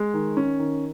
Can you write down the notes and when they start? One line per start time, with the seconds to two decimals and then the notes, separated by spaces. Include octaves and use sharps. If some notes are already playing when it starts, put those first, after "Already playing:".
Already playing: G#3
0.14 D#3
0.37 C#4
0.59 D#3